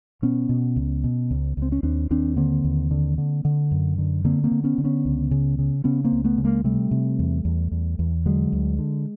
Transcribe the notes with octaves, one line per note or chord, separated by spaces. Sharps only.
B2 B3 C#4
B2
C#2
B2
C#2
C#2
C4
C#4
D#2 C4 D4
D#2 C4 D4
D3 A#3 C4
D#2
D3
D3
D3
F#2
D3
D3 A#3 C4
A#3 C4
D3
B3 C#4
D3
B3 C#4
C#2
C#3
C#3
C#3 B3 C#4
A#3 C4
C#2
A3 B3
C#3
G#3 A#3
C3 G3 A3
C3
E2
E2
E2
E2
D3 F#3 G#3
D2
D3